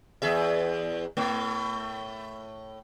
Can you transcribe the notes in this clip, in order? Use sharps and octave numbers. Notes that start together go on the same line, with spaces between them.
E2 G#4 E5
A2 A3